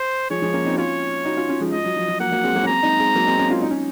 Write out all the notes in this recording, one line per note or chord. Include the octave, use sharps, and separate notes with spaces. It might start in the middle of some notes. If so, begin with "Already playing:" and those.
Already playing: C5
F3 G#3 C#5
F3 G#3
A#3 C#4
C4 D#4
F#4
C#4 F4 C#5
D#4 F#4
C#4 F4
C#4 F4
F3 G#3
F3 D#5
F#3
F3
F#3
F#3 A#3 F#5
F#3 A#3
G#3 C4
F#3 A#3
C#4
G#3 C4 A#5
C4 D#4
G#3 C4
F#3 A#3
G#3 C4
A#3 C#4
C#4 F4
D#4
C#4